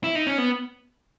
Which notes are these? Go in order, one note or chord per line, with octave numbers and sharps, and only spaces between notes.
E4
D#4
C#4
B3